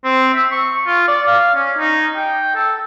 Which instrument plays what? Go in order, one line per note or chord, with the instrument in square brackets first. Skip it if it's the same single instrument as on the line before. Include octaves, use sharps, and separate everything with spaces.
[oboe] C4
E5
C#6
F4
D5
F5
C#4
D#4
G5
A4